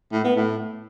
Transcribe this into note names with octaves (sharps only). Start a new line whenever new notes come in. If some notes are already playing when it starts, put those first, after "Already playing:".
A2
B3
A2